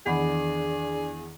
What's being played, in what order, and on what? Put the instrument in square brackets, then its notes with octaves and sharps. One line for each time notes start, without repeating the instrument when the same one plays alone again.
[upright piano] E2 [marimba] D#3 F#5 B5 [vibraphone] D4 D5 D6 [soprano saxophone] G#4